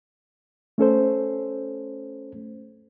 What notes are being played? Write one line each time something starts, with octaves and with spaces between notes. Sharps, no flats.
A3 C#4 A4 C5